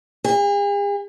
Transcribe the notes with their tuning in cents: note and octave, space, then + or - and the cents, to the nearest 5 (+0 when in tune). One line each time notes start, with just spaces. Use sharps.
G#4 -45